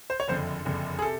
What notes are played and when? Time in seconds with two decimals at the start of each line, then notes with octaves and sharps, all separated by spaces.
0.10 C5
0.20 C#5
0.28 F#1 F2 D3 C5
0.65 F#1 F2 D3
0.99 G#4
1.02 C3 A4